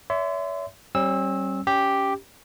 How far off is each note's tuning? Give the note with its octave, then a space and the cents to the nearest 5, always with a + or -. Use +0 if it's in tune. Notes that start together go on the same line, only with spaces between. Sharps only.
C#5 +40 E5 +0 C6 -30
G3 -25 C#4 -45 E6 -10
C#4 +20 G4 +0